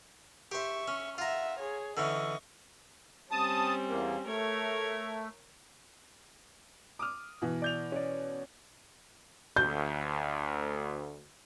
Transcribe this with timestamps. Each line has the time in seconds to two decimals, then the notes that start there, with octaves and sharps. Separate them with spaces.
0.51 G4 C5 E5 C#6
0.88 C#4
1.18 F4 E5 F#5 A#5
1.59 G#4 C#5
1.97 D3 E3 C#4 D#5 C#6
3.31 G3 C4 C#4 A5 D#6
3.88 E2 A#3
4.27 A3 A#4 C#5 G#6
6.99 D6 D#6 F6
7.42 B2 E3
7.62 D5 G6 F7
7.92 C#4 D5
9.56 D2 G6